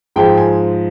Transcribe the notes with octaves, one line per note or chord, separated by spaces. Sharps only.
G#2 F3 G#3 G5
G#5